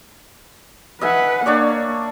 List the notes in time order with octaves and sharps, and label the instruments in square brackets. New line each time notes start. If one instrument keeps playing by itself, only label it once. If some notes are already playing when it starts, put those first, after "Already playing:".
[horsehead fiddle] B4 F#5 [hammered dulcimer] D#5 E5 G#5
[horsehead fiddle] A#3 [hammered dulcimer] D4 C#5 D5